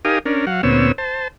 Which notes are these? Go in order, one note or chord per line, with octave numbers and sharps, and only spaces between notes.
D#4 G4 A#4 F5 G#5 D#6
C#4 D4 A#4
F#3 F5 F#5
D2 A#2 B3 C4 C#5 E6
C5 A5